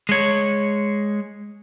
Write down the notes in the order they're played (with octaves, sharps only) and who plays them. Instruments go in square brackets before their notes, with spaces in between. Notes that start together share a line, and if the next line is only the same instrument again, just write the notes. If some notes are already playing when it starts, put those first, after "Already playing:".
[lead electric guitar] G#3 C#5